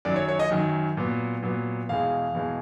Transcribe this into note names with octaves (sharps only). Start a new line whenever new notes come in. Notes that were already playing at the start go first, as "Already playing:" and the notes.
F#2 D#3 F#3 D5
C#5
C#5
D#5
F#2 D#3 F#3
A#2 F#3 B3
A#2 F#3 B3
E2 B2 G#3 F5
E2 B2 G#3